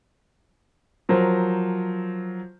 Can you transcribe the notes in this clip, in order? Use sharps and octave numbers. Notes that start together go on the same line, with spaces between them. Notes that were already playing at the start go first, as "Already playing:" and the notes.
F3 F#3 A#4 C5